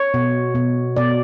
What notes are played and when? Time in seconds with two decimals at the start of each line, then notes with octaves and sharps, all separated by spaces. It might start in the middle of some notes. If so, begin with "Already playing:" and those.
Already playing: C#5
0.14 B2
0.55 B2
0.97 B2 D5